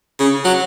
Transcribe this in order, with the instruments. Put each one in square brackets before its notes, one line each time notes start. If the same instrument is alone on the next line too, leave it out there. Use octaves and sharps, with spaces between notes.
[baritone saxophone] C#3
F#3